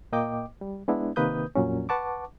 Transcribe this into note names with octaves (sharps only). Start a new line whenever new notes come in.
A#2 A#3 D#5 G5 D6
G3
G#3 B3 D4 E4
C3 D#3 A#3 B4 D#6 G6
F2 A#2 F#3 C#4
B4 F#5 A5 C#6 D6